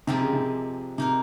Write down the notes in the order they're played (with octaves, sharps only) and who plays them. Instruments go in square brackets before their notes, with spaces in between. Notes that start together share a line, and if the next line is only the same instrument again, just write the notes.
[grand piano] C3 [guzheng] F3 G#3 C4 G4 A#4
[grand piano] C#3
C3
[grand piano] C3 [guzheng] A#3 D#4 A#4